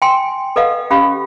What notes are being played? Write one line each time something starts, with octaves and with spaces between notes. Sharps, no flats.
G5 G#5 C6
A4 B4 D#5 F5 F#5
C#4 G4 F5 B5